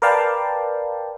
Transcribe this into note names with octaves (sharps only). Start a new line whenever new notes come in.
A#4 B4 D5 F5 G5 A5